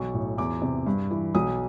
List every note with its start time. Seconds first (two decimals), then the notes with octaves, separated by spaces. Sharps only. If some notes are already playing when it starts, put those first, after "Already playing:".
Already playing: B1 C#6
0.14 A2
0.37 E2 D6
0.62 C3
0.86 G2
1.11 E3
1.35 B1 D#6